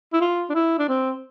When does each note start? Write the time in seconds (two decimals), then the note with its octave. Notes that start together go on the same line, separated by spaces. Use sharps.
0.13 E4
0.21 F4
0.49 D4
0.55 E4
0.79 D4
0.88 C4